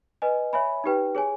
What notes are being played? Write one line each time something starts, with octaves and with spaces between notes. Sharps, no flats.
B4 D#5 G#5
C#5 E5 G#5 B5
D#4 G4 B4 G5
G#4 C#5 G#5